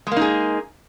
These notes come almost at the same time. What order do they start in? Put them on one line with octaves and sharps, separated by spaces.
G#3 A#3 D#4 G#4